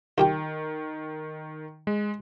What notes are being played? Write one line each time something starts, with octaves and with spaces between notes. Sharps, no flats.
D#3 F4 G4 G5
G#3